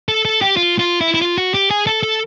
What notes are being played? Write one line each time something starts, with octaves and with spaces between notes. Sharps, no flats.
A4
A4
G4
F4
F4
E4
E4
F4
F#4
G4
G#4
A4
A4